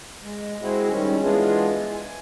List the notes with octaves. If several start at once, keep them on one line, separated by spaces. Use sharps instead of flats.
G#3
G#3 C4 E4 F#4 G#4
D#3 G3 C#4
E3 G#3 B3 D4 F4 G#4
G#5